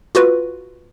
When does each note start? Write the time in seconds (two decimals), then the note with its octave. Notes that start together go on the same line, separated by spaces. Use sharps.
0.15 F4 F#4 B4